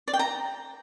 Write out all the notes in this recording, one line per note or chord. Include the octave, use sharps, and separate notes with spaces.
D5
G5
A#5